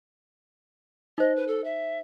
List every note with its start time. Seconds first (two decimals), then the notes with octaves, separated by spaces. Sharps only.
1.18 D#4 C5 D#5
1.35 B4
1.47 A4
1.64 E5